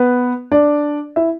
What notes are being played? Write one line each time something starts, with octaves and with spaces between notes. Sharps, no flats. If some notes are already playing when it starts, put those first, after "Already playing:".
Already playing: B3 B4
D4 D5
E4 E5